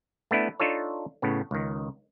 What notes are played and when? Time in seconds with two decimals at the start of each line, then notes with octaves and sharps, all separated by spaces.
0.31 A3 B3 D4 E4
0.60 D4 D#4 F4 A4 C#5
1.22 A2 C#3 B3
1.51 C#2 D#3